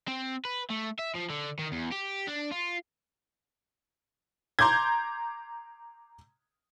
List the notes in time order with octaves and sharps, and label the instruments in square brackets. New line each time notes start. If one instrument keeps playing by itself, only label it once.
[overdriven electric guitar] C4
B4
A3
E5
F3
D3
D#3
E2
G4
D4
F4
[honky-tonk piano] A#5 C6 D6 G6 G#6